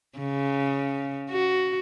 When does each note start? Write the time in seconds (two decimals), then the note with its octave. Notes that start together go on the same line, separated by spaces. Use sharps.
0.19 C#3
1.30 F#4